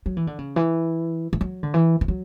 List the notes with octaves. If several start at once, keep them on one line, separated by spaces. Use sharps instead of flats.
F#3
E3
D3
C#3
E3
E3
F#3
D3
E3
E3
F#3